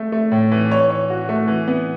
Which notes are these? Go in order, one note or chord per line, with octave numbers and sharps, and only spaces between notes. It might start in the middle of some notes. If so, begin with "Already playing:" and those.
Already playing: A3
A3
A2
E3
C#5
C#5
F#4
A3
E3
B3